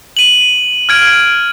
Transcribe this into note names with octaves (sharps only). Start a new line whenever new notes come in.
D#7 F#7
F6 G#6 D7
D7